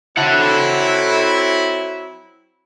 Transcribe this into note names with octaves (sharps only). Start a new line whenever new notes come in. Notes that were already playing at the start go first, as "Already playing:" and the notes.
F#3 C4 E4 A4 F#5